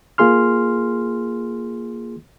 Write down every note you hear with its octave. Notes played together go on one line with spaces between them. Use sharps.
A#3 F4 G#4 C6 F6